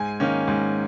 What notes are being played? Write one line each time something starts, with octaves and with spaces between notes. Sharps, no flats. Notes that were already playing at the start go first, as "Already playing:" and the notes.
Already playing: G#2 G#5
D#3 A#3 C#4
G#2